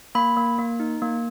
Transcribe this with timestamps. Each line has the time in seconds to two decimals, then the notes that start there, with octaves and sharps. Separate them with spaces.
0.15 A#3 B5
0.37 A#3
0.59 A#3
0.80 D#4
1.02 A#3